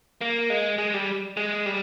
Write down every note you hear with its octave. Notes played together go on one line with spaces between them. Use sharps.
A#3
G#3
G#3
G3
G#3
G3